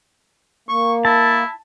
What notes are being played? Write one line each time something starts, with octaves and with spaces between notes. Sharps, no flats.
A#3 C#6
E4 A5